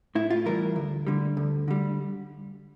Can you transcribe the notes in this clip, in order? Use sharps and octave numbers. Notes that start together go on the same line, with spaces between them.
A2 E4
F4
E3 G3 A#4
D2
D3 G3
D2
D3 G3